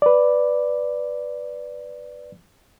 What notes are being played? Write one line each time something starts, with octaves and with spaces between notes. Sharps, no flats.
B4 D5